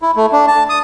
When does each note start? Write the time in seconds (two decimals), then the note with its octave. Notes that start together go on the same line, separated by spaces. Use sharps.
0.02 E4
0.16 A3
0.32 D4
0.48 A5
0.69 D#6